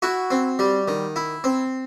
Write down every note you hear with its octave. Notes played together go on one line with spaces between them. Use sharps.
E4 F#4
C4
G3
D#3
E4
C4